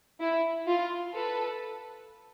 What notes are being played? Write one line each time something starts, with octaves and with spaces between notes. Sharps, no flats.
E4
F4
A4 B4